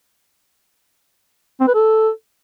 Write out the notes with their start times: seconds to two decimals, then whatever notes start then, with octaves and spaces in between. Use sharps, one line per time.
1.60 C4
1.67 B4
1.74 A4